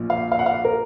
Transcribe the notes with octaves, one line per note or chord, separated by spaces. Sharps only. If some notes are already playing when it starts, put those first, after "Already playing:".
Already playing: A#1 A#2
F5
F5
F#5
F5
A#4